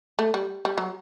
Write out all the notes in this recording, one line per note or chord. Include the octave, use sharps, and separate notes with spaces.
A3
G3
G3
F#3